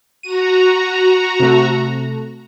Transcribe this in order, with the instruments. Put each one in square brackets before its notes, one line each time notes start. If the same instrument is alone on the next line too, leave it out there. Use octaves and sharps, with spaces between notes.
[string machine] F#4 A#5 [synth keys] D#7
[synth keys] C3 A3